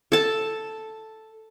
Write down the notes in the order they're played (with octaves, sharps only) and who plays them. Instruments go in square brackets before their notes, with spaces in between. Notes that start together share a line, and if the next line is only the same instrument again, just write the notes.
[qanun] A4 A5